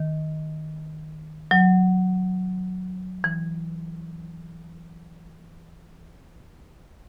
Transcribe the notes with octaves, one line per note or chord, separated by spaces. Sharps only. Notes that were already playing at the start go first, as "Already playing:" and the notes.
Already playing: D#3
F#3
E3